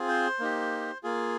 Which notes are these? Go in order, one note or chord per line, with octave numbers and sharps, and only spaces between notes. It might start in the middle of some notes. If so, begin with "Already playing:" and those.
Already playing: C4 F4 G#4
C5
A#3 D#4 G4
A#3 F4 G#4